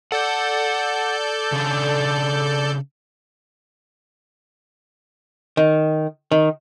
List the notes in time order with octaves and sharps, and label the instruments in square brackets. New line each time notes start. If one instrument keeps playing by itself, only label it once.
[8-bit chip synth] A4 D5 G6 [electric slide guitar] F#5
[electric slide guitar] C#3 D4
[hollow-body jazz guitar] D#3
D#3